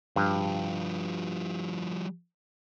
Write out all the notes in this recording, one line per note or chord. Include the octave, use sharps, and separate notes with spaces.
G2 F3 G3